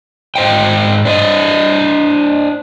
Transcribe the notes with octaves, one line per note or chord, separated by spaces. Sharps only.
G#2 C5 D#5 G5
D4 C5 D#5